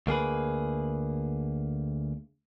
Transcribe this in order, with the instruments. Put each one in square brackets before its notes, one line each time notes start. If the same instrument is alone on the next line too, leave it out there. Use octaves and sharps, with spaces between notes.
[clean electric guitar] D2 A#3 G#4 B4